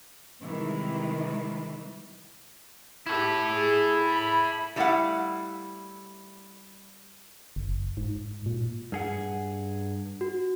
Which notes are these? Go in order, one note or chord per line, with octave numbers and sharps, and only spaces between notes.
C3 D#3 E3 G3 G#3
E4 G4 A4
G#4
B5
G3 A3 E4 D#5 F5 F#5
F#1
G#2
A#2
G2 G#4 F#5
F#4